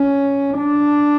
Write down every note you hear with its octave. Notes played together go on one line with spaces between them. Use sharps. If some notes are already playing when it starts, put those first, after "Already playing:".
Already playing: C#4
D4